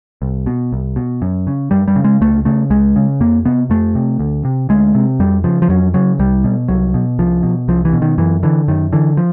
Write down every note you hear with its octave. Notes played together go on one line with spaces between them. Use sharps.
C2
B2
C2
B2
F#2
C#3
F#2 G3
G3
C#3
G#3
C#2 A3
C#3 A3
C#2 G#3
C#3
F2 A#3
C3 B3
F2 A3
C3
D2
C3
D2 G#3
C3
F2 G3
C#3 F3
F3
F2 F#3
C#3 F#3
C2 G3
B2
C2 F#3
B2
C2 F3
B2
C2 F3
E3
B2
D#3
F#2 E3
D3 E3
F#2 D#3
D3 E3
F3